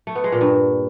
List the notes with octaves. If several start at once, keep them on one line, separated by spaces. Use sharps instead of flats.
A3
B3
G#3
A#2
G2